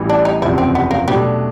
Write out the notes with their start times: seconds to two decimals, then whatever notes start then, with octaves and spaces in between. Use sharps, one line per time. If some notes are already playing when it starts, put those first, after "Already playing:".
Already playing: A1 A2 E3 G3
0.09 D4
0.25 D#4
0.42 F#1 E2 C3 F3 E4
0.58 C4
0.75 B3
0.91 A#3
1.07 B2 F#3 G3 A3 D4